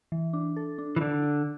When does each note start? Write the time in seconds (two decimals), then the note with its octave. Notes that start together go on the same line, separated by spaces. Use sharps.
0.12 E3
0.33 D4
0.56 A4
0.78 D4
0.96 E3
1.01 D3 D5
1.23 D4